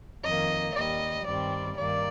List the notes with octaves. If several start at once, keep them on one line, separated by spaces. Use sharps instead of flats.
F2 D#3 A#3 D#5
D#2 D#3 G3 D#5
G2 D#3 G3 C4 D5
G2 D#3 A#3 D5